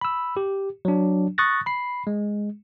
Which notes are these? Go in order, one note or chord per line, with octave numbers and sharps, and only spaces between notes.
B5 E6
G4
F#3 D4
C#6 D#6 F#6 A6 A#6
B5 C7
G#3